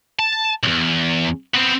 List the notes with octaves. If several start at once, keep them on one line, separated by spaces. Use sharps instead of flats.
A5
B1 E2
B3 C4